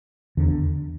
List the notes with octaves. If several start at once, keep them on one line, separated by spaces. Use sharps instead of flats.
E2 D3